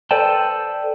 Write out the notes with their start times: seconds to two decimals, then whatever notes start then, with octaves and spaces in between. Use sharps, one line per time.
0.11 A4 B4 C5 D5 G5 A5